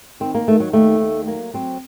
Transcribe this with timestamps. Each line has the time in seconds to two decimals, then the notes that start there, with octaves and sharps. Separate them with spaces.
0.20 D#3 C4
0.34 A#3
0.48 D#3 A3
0.60 F#3
0.73 D#2 A3
1.00 D#2
1.27 F#3 A#3
1.54 F#3 C4